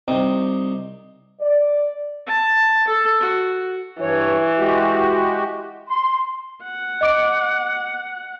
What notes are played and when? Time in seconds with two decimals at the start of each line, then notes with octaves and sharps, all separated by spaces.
0.08 C2 C3 C4 D#4 G5 D#6
1.41 D5
2.27 A5
2.87 A4
3.20 F#4
4.01 G2 E3 C#5
4.59 G#3 F#4 G4
5.87 C6
6.63 F#5
7.01 D#5 D6 D7